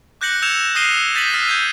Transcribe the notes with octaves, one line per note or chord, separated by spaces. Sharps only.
D6 F#6 G6 A#6 C#7 F#7
E6 G6 G#6 C#7 E7 F7
D#6 F6 A#6 C7 D#7 G7
G6 A6 B6 D#7 F#7
E6 F6 A6 B6
G6 G#6 D#7